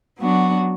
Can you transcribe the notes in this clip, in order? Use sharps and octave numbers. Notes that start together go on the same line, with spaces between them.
F#3 B3 D4 F#4